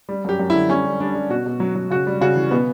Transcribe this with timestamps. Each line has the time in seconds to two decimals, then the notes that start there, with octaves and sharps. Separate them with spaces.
0.09 G3
0.25 F#2 G4
0.39 F#2
0.50 E4
0.54 D3
0.69 G3 C#4
0.84 G3
1.00 G3 D4
1.15 G3
1.30 B2 F#4
1.46 B2
1.60 F#3
1.76 F#3
1.90 C#3 F#4
2.07 G3
2.21 C#3 F#4
2.36 E3
2.51 B2 B3